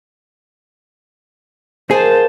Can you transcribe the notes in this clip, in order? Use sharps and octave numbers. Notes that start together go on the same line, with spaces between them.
A#3 D#4 F#4 G#4 C5 A5